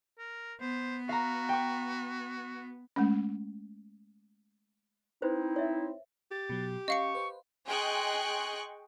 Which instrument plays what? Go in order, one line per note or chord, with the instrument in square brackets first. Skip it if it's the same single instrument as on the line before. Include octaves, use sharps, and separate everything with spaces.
[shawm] A#4
[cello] B3 [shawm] C5
[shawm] F#4 [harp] F5 A#5
[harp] G5 C#6
[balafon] G#3 A3 C#4
[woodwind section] C4 D#4 E4 [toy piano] B4 C5
[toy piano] C#5 E5
[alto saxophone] G4 [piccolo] A6
[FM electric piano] B2 F#3
[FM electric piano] C#4 [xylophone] D#5 F5 C#7 [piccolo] C#6
[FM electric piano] B4 C5
[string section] G#4 D#5 G5 C6 C#6 F#6